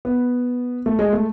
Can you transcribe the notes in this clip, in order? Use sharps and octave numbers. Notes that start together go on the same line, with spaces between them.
B3
A3
G#3
A3